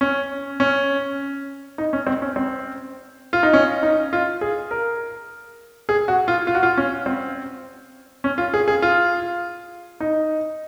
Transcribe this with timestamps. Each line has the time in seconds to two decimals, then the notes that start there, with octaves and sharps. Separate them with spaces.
0.01 C#4
0.60 C#4
1.78 D#4
1.93 C#4
2.07 C4
2.22 C#4
2.36 C4
3.33 F4
3.43 D#4
3.53 C#4
3.83 D#4
4.13 F4
4.41 G#4
4.71 A#4
5.89 G#4
6.08 F#4
6.28 F4
6.47 F4
6.55 F#4
6.63 F4
6.77 C#4
7.06 C4
8.24 C#4
8.38 F4
8.54 G#4
8.68 G#4
8.82 F4
10.00 D#4